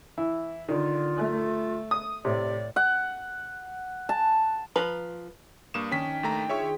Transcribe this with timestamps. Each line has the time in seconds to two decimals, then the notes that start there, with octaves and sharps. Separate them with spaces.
0.18 E3 E4
0.69 D3 D#3 F4
1.16 A3
1.91 D#6
2.25 A2 C3 D5
2.76 F#5
4.09 A5
4.76 F3 B4 A#5
5.74 G2 A#3 C#6 D#6 E7
5.92 D#3 C#4 D4 G5 B6
6.23 D#2 A3 A#5
6.49 F4 G#4 C#5 E5 C#6 B6